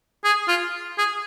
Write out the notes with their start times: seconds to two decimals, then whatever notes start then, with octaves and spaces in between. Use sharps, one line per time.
0.24 G#4
0.48 F4
0.98 G#4